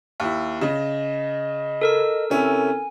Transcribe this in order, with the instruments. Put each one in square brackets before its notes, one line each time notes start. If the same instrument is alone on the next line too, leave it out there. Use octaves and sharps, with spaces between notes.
[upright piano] D#2 E4
[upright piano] C#3 [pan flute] D#5
[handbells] A4 A#4 E6
[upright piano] C3 C#4 E4 [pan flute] G#5